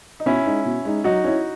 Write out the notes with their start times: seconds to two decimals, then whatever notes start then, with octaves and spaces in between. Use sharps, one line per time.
0.20 D#4
0.26 B2 C#4 E4
0.46 G#3 D#4
0.65 B2
0.85 G#3 D#4
1.04 F#3 D#4 F#4
1.24 C#4 E4